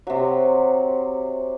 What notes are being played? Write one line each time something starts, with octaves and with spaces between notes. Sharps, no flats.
C3 F#3